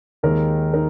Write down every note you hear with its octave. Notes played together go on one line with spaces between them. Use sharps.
D#2 D#3 G#3 D#4 A#4
D#4 A#4